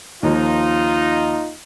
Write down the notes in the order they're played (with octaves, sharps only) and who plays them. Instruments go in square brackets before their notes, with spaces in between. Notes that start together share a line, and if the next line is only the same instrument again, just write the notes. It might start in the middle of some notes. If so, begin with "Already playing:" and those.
[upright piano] D#2 F3 [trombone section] D#4 F4